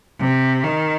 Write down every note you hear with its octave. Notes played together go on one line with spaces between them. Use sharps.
C3
D#3